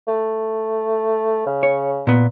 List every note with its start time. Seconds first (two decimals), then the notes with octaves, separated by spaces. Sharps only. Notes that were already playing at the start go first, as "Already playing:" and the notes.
0.07 A3
1.46 C#3
1.63 C#5
2.07 A#2 B3